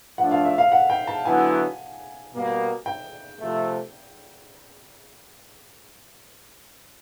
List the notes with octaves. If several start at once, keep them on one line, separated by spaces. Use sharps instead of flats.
F3 A3 D4 F#5
F5
E5
F5
F#5
G5
A5
D3 F#3 B3 E4 G#5
B2 G3 A#3
G5
C3 F3 A3